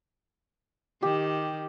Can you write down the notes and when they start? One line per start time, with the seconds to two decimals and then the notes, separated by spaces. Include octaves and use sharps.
1.03 D#3 G4